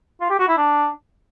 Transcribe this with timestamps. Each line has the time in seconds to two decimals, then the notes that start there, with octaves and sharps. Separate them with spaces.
0.21 F4
0.30 G4
0.39 F#4
0.48 E4
0.57 D4